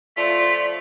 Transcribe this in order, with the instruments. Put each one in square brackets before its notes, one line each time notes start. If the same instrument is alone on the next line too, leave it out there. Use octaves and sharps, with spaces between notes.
[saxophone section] F3 A3 F4 [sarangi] D5 [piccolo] B6